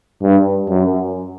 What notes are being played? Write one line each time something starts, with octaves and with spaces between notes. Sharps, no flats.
G2
F#2